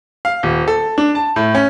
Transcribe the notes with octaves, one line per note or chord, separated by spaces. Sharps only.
F5
D#1
A4
D4
A5
A2
C#4